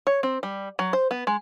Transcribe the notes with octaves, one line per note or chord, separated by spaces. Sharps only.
C#5
C4
G3
F#3
C5
B3
G#3